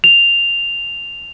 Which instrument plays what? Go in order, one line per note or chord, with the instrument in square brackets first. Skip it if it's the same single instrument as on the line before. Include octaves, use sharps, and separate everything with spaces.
[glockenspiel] F7